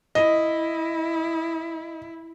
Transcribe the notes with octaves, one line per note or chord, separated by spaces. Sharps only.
E4 D#5